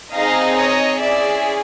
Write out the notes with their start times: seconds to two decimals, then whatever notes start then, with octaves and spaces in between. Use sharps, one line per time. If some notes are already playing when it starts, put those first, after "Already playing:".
0.13 C4 D#4 G#4 D#5 F5
0.56 C#5 D#5
1.00 C#4 E4 G#4 D5 E5